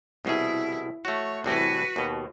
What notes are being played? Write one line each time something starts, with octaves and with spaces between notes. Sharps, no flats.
C2 B2 E4 G#4
A3 F#4 C#5
C2 A2 E3 F#4 B4
D#2 B2